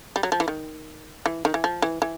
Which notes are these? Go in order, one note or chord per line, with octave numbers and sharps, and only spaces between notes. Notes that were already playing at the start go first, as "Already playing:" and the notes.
G3
F#3
F3
E3
D#3
E3
D#3
E3
F3
E3
E3